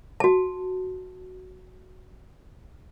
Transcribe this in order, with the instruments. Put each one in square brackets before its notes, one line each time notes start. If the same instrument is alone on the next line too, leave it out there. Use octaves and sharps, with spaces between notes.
[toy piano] F#4 A5